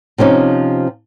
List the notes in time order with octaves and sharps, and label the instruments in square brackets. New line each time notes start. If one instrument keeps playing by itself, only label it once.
[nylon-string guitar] C3 F3 C#4 D#4